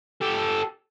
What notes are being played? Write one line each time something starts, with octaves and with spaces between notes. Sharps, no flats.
G4 A4